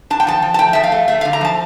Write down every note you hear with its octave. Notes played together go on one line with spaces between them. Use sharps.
D4 A5
G5
F3 A5
F3
A5
A3 G5
F3 E5
F5
A3
A3 E5
F5
D3
A#5
F3 A5